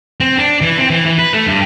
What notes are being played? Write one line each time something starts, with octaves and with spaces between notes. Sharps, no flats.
C4
D4
E3
C4
E3
E3
B4
A3
G2